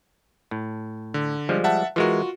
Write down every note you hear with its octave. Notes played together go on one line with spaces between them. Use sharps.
A2
D3
F3 G3 G#3
E5 F#5 A5
E3 G#3 F4 F#4 A#4